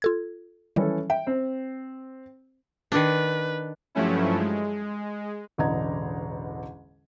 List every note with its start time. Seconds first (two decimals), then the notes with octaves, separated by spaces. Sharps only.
0.02 F4 A4 G#6
0.76 D#3 E3 F#3 G3 C#4 A4
1.10 E5 G5
1.27 C4 C5
2.92 D#3 D4 B4
3.95 G2 F3 F#3 A3 C#4 E4
4.39 G#3
5.58 E1 A1 D3 D#5 A#5 G#6